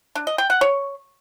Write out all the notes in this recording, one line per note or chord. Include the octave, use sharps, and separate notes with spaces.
D4
D#5
G5
F#5
C#5